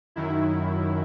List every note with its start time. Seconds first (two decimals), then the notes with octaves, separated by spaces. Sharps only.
0.16 F#2 D#3 F#3 E4